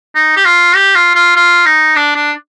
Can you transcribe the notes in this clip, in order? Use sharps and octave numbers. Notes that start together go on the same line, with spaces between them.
D#4
G4
F4
G4
F4
F4
F4
D#4
D4
D4